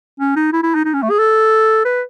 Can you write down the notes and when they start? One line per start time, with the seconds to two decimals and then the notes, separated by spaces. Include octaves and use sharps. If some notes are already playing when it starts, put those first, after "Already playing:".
0.20 C#4
0.36 D#4
0.53 E4
0.63 E4
0.75 D#4
0.85 D#4
0.94 C#4
1.02 A3
1.10 G#4
1.19 A4
1.85 B4